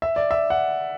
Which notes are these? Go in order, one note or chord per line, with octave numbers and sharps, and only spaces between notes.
E5
D5
E5
F#5